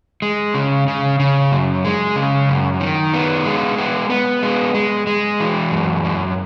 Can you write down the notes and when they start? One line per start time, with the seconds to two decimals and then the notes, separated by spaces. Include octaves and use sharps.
0.22 G#3
0.54 C#3
0.88 C#3
1.20 C#3
1.52 F#2
1.85 G#3
2.16 C#3
2.49 F#2
2.81 D#3
3.14 B3
3.46 G#3
3.78 B3
4.10 B3
4.43 G#3
4.75 G#3
5.07 G#3
5.40 E3
5.72 F#2
6.04 F#2